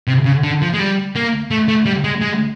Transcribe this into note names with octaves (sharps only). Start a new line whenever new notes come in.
C3
C#3
D3
F3
G#3
G3
A#3
A3
A3
G3
G#3
G#3